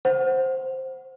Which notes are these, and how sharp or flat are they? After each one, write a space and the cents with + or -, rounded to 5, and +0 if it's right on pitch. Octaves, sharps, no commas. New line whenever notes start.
C5 +5 F#5 +0